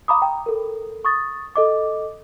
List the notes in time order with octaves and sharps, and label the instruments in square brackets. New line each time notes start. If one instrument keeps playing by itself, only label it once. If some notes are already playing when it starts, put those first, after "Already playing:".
[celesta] F5 A#5 B5 D6 D#6
G5 A#5
A4 A#4
C#6 D#6 A6
A4 D#5 D6